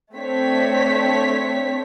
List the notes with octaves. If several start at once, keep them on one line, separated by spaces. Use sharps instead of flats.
A3 C4 D4 C#5 B6